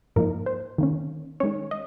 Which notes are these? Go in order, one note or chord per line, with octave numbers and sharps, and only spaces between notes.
G#2 F3 A#3 D#4 A#4
C5
D#3 A#3 C#4
D#3 G#3 C#4 C#5
D#5